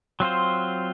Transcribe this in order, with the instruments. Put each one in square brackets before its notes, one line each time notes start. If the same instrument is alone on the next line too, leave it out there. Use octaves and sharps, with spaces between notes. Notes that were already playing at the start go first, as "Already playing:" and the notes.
[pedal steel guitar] F#3 C4 F4 C5